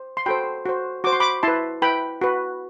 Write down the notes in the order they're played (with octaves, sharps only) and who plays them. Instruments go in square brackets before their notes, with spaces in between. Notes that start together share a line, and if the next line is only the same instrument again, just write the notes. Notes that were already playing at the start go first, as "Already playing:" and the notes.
Already playing: [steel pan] C5
C6
F#4 A4 C5 G5 B5
F#4 C5
F#4 C5 D6
C6
B5 D6
E4 B4 A5 C6
E4 B4 G5 B5
F#4 B4